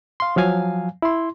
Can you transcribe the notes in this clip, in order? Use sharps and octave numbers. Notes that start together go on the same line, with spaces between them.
F5 C6
F3 F#3 F5 G#5
E4 C6